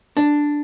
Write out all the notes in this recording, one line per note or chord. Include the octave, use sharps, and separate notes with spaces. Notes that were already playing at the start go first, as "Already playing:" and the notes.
D4